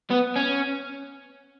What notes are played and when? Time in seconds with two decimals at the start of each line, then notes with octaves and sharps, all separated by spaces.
0.10 B3
0.36 C#4